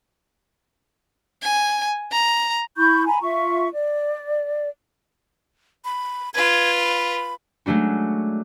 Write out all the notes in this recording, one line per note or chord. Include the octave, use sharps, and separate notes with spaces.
G#5
A#5
E4 B5 C#6 G6
G#5 A#5 B5
F4 E5 C#6
D5
B5
F4 B4 G#6
B5
F#3 G#3 A3 D4 F#4